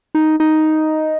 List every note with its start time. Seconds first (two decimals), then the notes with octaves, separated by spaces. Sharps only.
0.15 D#4
0.40 D#4